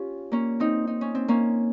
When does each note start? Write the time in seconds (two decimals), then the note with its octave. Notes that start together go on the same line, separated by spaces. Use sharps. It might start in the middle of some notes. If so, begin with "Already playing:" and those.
Already playing: C#4 F4 G4
0.32 A#3 C#4
0.60 C4 D#4
0.87 D#4
1.01 C#4
1.15 C4
1.28 A#3 C#4